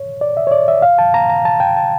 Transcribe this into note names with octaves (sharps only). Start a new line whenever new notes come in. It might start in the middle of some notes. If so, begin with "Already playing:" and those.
Already playing: C#5
D5
E5
C#5
D5
E5
F5
A5
A#5
A#5
A5
G5
A5